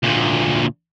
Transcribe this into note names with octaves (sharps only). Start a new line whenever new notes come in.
D2 A#2